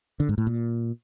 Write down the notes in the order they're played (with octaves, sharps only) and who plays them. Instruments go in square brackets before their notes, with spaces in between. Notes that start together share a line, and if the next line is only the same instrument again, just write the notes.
[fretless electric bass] D3
G#2
A2
A#2